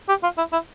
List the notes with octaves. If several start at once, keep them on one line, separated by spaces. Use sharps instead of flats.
G4
F4
E4
E4